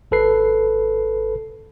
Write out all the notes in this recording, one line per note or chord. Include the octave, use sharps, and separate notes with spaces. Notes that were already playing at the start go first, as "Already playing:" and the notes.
G#1 A4 B4 C7